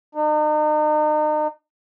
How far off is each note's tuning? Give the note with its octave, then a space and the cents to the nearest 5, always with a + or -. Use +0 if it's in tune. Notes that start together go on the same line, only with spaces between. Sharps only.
D#4 -40